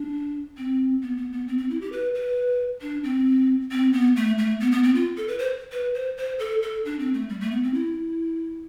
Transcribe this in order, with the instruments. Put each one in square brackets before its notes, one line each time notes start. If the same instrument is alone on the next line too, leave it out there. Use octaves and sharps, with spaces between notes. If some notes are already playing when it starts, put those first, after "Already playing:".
Already playing: [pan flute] D4
C4
B3
B3
B3
C4
C4
E4
G4
B4
B4
D4
C4
C4
B3
A3
A3
B3
B3
C4
F4
A4
B4
C5
B4
C5
C5
A4
A4
D4
C4
A3
G3
A3
B3
C4
E4